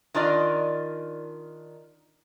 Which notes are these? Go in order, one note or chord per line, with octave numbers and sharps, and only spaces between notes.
D#3 D4 F4 D5 D#5